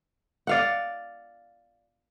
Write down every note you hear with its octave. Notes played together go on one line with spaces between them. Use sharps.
D5 F5 F#5